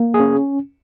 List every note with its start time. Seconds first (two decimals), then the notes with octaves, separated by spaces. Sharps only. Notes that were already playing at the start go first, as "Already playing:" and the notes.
Already playing: A#3
0.14 G#4
0.20 C#4